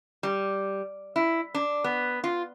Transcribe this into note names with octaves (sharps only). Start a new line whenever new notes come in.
G3
E4
D4
B3
F4